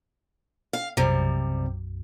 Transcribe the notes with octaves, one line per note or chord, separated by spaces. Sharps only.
F5
B1 F#2 C3 G3